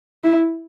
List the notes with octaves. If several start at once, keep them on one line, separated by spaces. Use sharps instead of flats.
E4